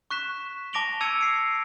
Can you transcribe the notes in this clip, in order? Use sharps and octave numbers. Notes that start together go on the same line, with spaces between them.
C#6 F#6 B6 E7
A5 D6 A#6 D7 F7 G7
A5 E6 G#6 C#7 D#7 F7
C7 D7